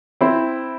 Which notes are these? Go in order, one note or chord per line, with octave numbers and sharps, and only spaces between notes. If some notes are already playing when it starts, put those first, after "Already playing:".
C4 E4